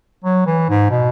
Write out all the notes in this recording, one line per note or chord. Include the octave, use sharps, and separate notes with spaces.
F#3
E3
G#2
B2